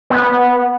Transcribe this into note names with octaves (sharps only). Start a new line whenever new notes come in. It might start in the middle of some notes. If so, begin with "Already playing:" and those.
B3